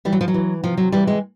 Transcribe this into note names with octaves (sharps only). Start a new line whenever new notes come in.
E3 G3
F#3
F3
F#3
E3
C3 F3
F#3
E3 G3
G#3